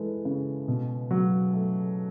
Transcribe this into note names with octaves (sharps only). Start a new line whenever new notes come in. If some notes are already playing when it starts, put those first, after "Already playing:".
Already playing: E3 G#3 A4 B4
C#3
B2
F#3
A3